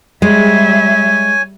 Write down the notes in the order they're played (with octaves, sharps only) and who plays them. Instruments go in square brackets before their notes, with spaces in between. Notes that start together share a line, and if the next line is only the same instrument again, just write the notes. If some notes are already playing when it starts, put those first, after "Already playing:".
[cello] G3 E5 [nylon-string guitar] G#3 [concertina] C#5 G#5